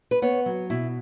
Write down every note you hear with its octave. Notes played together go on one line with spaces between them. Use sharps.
B4
B3 C#5
F#3
B2 E4